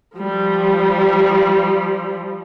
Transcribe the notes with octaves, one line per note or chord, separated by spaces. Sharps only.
F3 G3